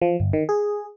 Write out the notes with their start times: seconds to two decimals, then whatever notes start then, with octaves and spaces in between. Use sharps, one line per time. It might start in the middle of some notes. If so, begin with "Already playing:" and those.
0.02 F3
0.20 G1
0.33 D#3
0.49 G#4